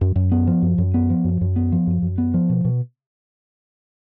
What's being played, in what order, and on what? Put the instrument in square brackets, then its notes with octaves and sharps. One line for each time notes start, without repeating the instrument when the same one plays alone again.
[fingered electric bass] F#2
F#2
B3
F3
F#2
F#2
B3
F3
F#2
F#2
B3
F3
F#2
F#2
B3
F3
B2
B2